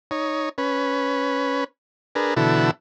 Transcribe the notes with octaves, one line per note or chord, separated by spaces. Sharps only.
D#4 C#5
C#4 B4
D4 G#4 A#4 B4
B2 D3 E3 E4 F#4 A4